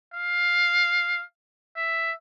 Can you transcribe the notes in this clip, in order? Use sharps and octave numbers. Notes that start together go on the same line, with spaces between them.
F5
E5